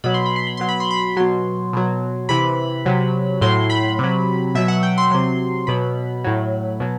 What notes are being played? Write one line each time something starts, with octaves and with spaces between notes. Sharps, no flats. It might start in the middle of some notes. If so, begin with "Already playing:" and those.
B2 F#3 B5
C6
B5
C6
B5
B2 F#3 C6
B5
C6
B5
B2 F#3 C6
B2 F#3
C3 E3 B5
C3 F#3
A2 F#3 C6
B5
C3 F#3
B2 F#3 E5
F#5
G5
C6
C3 F#3
B2 F#3 B5
A2 F#3
B2 F#3